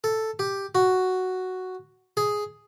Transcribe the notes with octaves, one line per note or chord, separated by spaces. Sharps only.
A4
G4
F#4
G#4